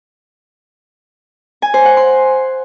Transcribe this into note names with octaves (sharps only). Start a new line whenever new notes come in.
G#5
C5
F#5
C6